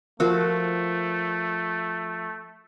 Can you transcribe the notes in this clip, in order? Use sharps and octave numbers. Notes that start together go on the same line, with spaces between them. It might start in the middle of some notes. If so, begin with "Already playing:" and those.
F3 A3 F#4 A#4